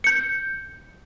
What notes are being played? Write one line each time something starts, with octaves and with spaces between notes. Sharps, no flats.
G6 C#7